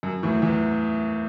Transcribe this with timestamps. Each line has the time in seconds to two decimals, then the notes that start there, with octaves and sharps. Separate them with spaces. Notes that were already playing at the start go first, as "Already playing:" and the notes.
0.03 F#2
0.23 E2 A2
0.42 E2